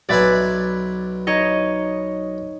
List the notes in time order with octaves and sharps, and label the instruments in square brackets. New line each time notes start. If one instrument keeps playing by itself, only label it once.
[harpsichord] B1 B4 G#5 [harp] D5 E5
[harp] D#4 C#5 D#5